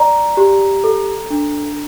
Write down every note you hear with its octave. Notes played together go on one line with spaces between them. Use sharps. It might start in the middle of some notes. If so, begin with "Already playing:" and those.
Already playing: D5 A#5
G4
A4
D4